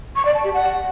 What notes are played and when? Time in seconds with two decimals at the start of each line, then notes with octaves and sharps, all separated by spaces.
0.16 C#6
0.25 D5
0.35 A5
0.44 G4
0.54 F#5